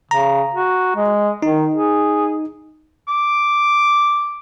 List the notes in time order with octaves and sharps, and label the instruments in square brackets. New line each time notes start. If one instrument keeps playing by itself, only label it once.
[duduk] C#3 [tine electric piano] A#5
[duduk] F#4
G#3
[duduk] D#3 [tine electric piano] D#4
[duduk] G#4
[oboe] D6